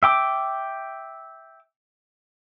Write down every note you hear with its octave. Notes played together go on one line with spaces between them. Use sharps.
E5 G5 D6